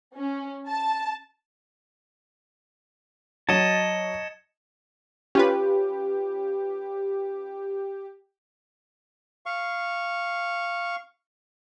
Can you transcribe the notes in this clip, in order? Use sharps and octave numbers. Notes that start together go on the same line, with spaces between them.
C#4
A5
F#3 D#5 A5 G#6 C#7 E7
C#4 F4 G4 B4
F5 C#6